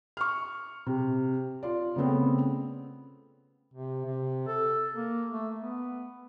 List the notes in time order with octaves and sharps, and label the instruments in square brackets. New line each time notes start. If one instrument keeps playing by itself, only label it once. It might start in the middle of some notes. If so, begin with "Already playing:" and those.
[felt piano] C#6 F6
C3
F4 D5
C#3 A3 B3 C4
[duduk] C3
C3
A4
A#3
A3
B3